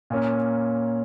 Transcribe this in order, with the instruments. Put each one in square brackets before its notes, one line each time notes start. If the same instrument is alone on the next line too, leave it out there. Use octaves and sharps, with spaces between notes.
[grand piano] A#2 A#3 C#4